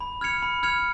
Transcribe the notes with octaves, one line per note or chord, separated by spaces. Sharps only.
B5
F6 G#6 C#7 F7
B5
F6 G#6 C#7 F7